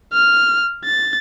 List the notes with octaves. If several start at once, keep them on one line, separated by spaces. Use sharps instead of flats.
F6
A6